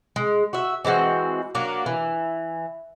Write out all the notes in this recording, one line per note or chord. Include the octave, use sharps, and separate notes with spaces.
G#3
F#4 E5
E3 G#3 C4 F#4
F#3 A#3 D4
E3